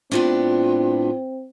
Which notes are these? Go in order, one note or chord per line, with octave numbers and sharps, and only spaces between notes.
A2 B3 C4 D4 F4